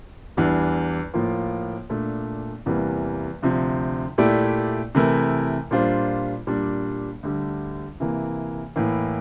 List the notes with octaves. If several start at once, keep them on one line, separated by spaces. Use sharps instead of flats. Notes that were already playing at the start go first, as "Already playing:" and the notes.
E2 E3 G3 D4
A2 F3 A#3 F4
A#2 A3 D4
E2 C3 E3 G3 A#3
D2 C3 F3
A#2 A3 E4 G4 D5
C3 E3 A3 E4 A#4
A#2 G3 D4 F4 C5
A#2 G3 D4
D2 D3 G3
C3 E3 A#3
A2 E3 A#3